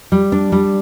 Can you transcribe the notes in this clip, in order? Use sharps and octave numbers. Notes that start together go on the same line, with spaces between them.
G3
D4
G3